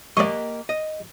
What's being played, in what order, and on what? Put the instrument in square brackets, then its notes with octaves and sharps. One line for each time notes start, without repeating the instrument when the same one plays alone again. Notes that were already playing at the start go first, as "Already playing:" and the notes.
[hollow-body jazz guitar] A#3 G4 D#5 [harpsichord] D5 C#6
[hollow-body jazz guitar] D#5